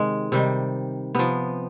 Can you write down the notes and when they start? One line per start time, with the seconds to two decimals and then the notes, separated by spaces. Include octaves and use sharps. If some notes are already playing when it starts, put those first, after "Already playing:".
Already playing: C3 D#3 G#3
0.32 C3 D#3 G3
1.15 C3 F3 B3